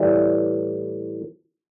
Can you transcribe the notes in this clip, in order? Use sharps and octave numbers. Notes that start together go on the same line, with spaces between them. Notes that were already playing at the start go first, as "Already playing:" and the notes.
Already playing: A2 E3 G3